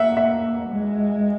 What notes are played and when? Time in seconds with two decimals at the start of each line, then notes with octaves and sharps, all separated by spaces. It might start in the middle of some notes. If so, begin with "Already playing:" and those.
Already playing: A#3 E5 F#5
0.17 E5
0.69 G#3